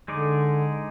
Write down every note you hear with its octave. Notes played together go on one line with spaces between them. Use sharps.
D3 G#3 D#4 D5